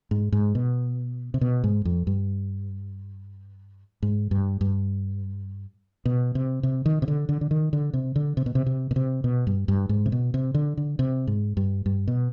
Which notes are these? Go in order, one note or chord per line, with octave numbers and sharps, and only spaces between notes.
G#2
G#2
B2
C3
B2
G#2
F2
G2
G#2
G2
G2
B2
C3
C3
D#3
C3
D3
D3
D3
D#3
D3
C3
D3
C3
B2
C3
C3
B2
C3
B2
G2
G2
G#2
C3
B2
C3
D3
D3
C3
G#2
G2
G2
B2